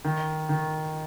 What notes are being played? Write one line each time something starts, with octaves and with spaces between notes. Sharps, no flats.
D#3
D#3